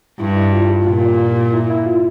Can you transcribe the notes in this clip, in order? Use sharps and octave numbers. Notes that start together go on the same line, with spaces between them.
G2 E4
E4
F4
G4
A#2 F4
E4
E4
F4